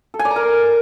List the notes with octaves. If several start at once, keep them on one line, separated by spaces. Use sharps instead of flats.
A4
G#5
D5
A#5
A#4